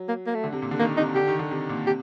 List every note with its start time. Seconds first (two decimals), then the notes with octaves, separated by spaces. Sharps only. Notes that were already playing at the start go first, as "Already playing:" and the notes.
Already playing: F#3
0.08 A#3
0.27 A#3
0.35 A3
0.44 D3
0.52 C3
0.62 A#2
0.71 D3
0.79 D#3 A#3
0.97 C3 D#4
1.15 D3 G4
1.27 D#3
1.39 D3
1.51 C3
1.69 A#2
1.86 C3 G4